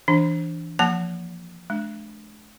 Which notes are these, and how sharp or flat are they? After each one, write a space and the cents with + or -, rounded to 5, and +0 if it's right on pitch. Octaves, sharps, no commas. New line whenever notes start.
E3 +0 D4 +0
F3 +0 A#3 +0 A5 -10
G#3 +45 D4 +0